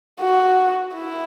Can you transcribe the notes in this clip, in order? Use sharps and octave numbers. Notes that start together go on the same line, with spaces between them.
F#4
E4